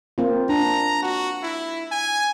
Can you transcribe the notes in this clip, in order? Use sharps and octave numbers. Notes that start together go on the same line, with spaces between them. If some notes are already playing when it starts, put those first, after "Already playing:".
A#3 C4 F4
D4 A#5
F#4
E4
G#5